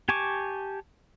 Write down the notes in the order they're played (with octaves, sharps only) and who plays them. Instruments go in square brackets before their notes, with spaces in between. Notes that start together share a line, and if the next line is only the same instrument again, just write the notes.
[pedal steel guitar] G4 G#5 A5 C#6 D6